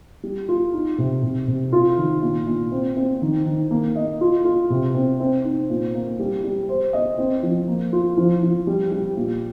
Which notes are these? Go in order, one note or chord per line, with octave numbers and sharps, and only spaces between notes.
G3
F4
D#4
C3
C3
C3
F4
D#3
A#2
A#2
C4
C4
D#3
D#3
A#3
D#5
F4
F4
C3
C4
C4
D#4
A#2
A#3
G3
G3
C5
D#5
C4
F3
A#3
F4
F3
F3
G3
G3
A#2